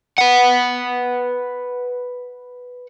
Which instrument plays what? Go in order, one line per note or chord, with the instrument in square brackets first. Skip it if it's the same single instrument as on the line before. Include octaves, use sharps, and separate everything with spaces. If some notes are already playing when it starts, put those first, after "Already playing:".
[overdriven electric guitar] B4 F#5